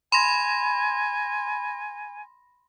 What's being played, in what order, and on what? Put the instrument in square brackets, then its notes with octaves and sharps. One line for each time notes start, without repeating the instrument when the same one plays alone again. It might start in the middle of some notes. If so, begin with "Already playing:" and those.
[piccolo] G#5 [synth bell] B5 C6 A#6